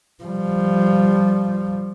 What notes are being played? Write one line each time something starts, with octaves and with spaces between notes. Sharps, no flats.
F3 G3